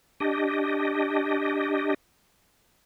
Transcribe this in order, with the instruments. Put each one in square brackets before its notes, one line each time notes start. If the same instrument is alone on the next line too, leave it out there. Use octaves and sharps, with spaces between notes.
[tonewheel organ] D4 G4 D#5